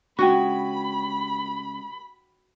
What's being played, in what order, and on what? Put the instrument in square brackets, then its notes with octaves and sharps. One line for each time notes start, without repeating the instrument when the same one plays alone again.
[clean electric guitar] C#3 G#3 [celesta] D4 G5 [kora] F#4 [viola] B5